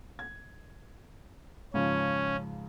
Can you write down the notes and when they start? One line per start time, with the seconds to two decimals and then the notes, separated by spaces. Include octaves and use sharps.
0.19 G#6
1.74 G#2 C#3 F3 C#4